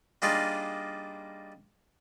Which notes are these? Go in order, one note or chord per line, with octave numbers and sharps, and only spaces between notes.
G3 A#3 D4 D#4 F4 G#4